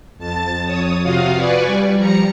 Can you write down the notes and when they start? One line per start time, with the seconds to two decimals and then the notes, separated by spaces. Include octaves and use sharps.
0.18 F2 A5 A6
0.66 F2 C#5 D#6
1.03 C3 F4 F#4 F5 D#6
1.34 B4 D5 G#5 C#6
1.66 G3
1.96 F3 G3 A#5 C#7